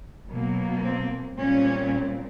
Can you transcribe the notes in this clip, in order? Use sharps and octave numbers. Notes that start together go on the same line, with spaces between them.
B2 F#3 A#3
C4
A#2 G3 C4 C#4